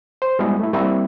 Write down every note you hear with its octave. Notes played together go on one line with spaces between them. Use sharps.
C5
G3 G#3 B3 E4 F#4 G#4
A3 E4
G3 A#3 C4 E4